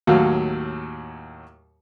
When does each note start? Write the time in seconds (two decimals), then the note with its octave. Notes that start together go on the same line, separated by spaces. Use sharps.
0.07 D#2 A2 F#3 F5